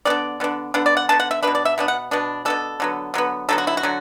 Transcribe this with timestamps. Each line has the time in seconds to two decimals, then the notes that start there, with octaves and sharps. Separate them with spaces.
0.05 D3 B3 D4 D5
0.40 D3 B3 D4
0.74 D3 B3 D4 F#5
0.86 D5
0.97 F#5
1.09 D3 B3 D4 A5
1.20 F#5
1.31 E5
1.43 B2 B3 D4 B4
1.55 D5
1.65 E5
1.78 B2 B3 D4
1.88 F#5
2.11 B2 B3 D4
2.45 B2 B3 D4 A4
2.80 D3 F#3 B3
3.14 D3 F#3 B3
3.49 D3 F#3 B3 A4
3.58 F#4
3.67 E4
3.77 F#4
3.83 D3 F#3